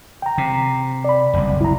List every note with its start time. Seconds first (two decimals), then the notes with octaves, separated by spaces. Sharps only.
0.22 G5 A#5
0.38 C3
1.05 D5 B5
1.34 F#1 C2
1.61 E4 A#5